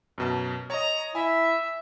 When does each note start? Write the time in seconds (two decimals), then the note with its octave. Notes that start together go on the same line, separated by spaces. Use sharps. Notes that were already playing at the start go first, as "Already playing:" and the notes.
0.18 F#2 B2 A5
0.70 C#5 D#5 A#5
1.15 E4 E5 G#5